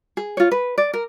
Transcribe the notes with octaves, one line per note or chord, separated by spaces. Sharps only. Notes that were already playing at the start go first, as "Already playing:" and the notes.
G#4
F4 C#5
B4
D5
A#4